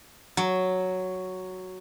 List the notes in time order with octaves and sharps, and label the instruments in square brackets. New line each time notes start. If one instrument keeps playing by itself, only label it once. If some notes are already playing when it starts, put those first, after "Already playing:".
[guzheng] F#3